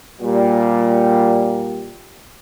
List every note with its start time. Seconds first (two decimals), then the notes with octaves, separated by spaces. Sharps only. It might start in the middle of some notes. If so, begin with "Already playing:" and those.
0.22 A#2 G3